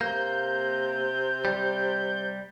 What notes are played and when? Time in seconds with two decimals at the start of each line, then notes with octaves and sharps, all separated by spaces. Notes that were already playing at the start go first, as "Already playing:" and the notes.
0.01 C3 A#3 G6
1.45 G3